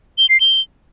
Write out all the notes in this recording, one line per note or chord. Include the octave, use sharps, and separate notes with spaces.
G7
C7
G7